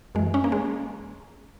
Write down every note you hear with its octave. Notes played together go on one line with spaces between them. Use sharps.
F#2 E3 G#3
C#4
A#3
G#3